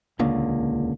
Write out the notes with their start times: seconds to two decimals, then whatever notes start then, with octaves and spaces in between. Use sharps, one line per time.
0.19 D#1 C#2 D3 A#3